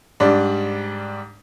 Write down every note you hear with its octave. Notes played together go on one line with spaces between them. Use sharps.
G#2 G3 D4